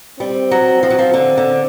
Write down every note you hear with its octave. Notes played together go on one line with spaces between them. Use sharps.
G3 C4
F#3
F3
F#3
F3
D3
D3